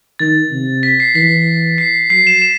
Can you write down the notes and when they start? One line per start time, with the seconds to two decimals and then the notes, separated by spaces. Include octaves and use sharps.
0.19 D#3 A6
0.51 C3
0.83 B6
1.00 C7
1.15 E3 B6
1.78 C7
2.10 F#3 C7
2.27 E7
2.42 E7